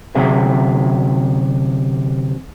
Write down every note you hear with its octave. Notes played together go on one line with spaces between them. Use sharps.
D2 C3 F#3 F#4 G#4 E5